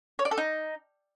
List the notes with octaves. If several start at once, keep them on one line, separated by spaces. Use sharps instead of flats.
C#5
D5
A4
D#4